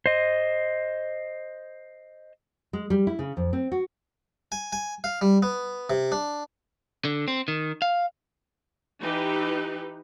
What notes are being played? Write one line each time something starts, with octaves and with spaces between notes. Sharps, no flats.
C5 D#5
G#3
G3
E4
C#3
F2
C4
F#4
G#5
G#5
F5
G3
B3
C3
D4
D3
C4
D#3
F5
E3 D#4 G4 B4